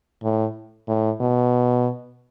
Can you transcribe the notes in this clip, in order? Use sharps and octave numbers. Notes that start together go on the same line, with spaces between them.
A2
A2
B2